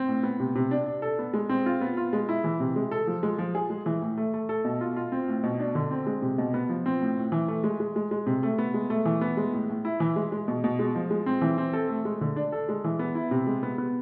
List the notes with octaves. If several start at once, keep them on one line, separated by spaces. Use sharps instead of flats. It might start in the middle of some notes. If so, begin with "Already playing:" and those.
Already playing: C4
A2
B3
C3
C3
D4
D4
A4
B3
G#3
C4
F4
B3
F4
G#3
E4
E3
C3
G#3
A4
F3
G#3
F3
G#4
G#3
E3
A2
A3
A3
A4
B2
F4
F4
C4
A2
B2
D4
D3
C4
G#3
C3
B2
B3
F3
C4
A2
A2
E3
A3
G#3
G#3
G#3
G#3
C3
A3
B3
G#3
A3
E3
B3
G#3
A2
A2
E4
E3
G#3
G#3
B2
B2
G#3
F3
G#3
C4
E3
C4
A4
A3
G#3
D3
D4
A4
G#3
E3
B3
E4
C3
G#3
B3
B3